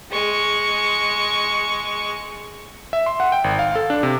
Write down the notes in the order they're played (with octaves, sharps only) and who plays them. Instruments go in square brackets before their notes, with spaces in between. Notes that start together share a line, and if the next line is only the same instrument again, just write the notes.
[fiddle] G#3 C#6
[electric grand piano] E5
C6
F#5
G5
G#1
F5
A4
D4
C3